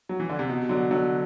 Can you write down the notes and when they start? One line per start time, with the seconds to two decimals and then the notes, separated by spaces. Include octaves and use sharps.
0.09 F#3
0.20 E3
0.29 D3
0.39 C3
0.49 B2
0.69 D3 F#3
0.91 D3 F#3